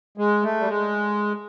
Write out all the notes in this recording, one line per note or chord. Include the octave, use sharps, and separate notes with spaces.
G#3
A3
G3
G#3